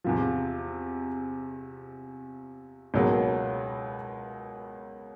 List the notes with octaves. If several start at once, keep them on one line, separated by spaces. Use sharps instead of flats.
E2 C3 F3
C#2 B2 F#3 A#3